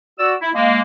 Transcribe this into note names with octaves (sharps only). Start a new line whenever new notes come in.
F#4 D5 E6
E4
G#3 A#3